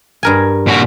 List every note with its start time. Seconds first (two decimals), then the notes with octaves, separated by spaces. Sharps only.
0.23 G2 A#4 G#5
0.67 A#2 F#4